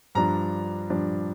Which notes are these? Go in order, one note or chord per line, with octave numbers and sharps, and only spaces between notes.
G2 F3 D4 A#5
G2 F3 D4